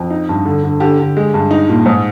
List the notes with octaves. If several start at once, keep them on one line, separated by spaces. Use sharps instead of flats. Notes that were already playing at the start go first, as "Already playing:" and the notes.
Already playing: F2
D#4
G2
D3
D3
D3 G4
D3
G#3
G2
D#4
A#2
G#2